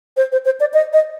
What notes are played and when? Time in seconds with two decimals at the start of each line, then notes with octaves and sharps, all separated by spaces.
0.17 C5
0.32 C5
0.45 C5
0.60 D5
0.74 D#5
0.93 D#5